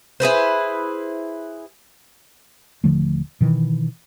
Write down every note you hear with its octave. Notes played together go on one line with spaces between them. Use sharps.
E4 G#4 B4 C5
D#1 D3 F3 A3
B2 D#3 E3